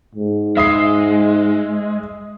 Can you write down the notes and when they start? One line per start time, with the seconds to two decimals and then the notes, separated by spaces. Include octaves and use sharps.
0.15 G#2
0.57 G#3 E5 D#6 C7